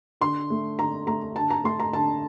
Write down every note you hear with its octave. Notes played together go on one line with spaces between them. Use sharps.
D3 C6
A3
D3 A#5
A3 A#5
D3 A5
A#5
A3 C6
A#5
D3 A5